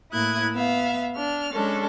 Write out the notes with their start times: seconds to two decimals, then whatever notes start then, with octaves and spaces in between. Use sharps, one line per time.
0.12 A2 A#3 E4 D#6 F#6 G#6
0.53 B3 E5 F5
1.16 D4 F6
1.54 G#3 C#4 D4 A4